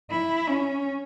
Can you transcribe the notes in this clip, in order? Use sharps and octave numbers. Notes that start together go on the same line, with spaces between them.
E4
C#4